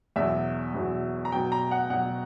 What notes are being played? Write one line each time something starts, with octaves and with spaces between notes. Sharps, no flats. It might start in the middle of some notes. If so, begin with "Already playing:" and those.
E2 B2 F#3 E5
E2 B2 F#3
A#5
B2 F#3 G5
A#5
F#5
B2 F#3 F#5